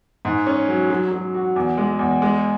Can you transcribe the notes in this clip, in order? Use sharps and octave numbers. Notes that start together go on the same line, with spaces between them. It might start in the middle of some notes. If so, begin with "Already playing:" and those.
G#2
C#4
F#3
F#3
F#3
F#4
E2
G#3
E2
G#3